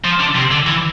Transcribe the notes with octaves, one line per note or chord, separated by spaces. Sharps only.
F3
D3
C3
D3
E3